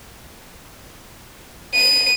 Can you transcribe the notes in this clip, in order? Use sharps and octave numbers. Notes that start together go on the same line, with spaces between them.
D#7